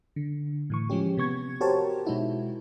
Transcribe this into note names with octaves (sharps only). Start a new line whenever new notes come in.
D3
A2 E3 C#6
F3 G#3 C#4 G4
C3 B3 C#6 G#6
F#4 G4 A#4 C5 C#5 A5
B2 G#3 D#4 E4 F#4